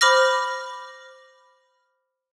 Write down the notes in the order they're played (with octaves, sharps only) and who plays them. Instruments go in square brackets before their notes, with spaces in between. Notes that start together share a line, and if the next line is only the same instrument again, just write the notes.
[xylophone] C5 B5 D6 F6 A#6